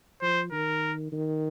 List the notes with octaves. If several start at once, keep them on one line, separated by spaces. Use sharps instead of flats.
F3 C5
D#3 A#4
D#3